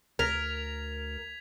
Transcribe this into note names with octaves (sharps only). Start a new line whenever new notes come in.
D2 A#4 G#6 B6 F7